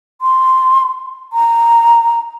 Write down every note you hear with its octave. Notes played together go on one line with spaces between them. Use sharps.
C6
A#5